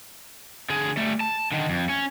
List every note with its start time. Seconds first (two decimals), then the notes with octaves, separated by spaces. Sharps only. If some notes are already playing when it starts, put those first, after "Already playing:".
0.70 D3 G#4
0.97 G3 A3
1.20 A5
1.52 D3 D#3
1.69 F2
1.89 C#4